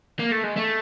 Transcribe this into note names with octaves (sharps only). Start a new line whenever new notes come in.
A#3
A3
G#3
A3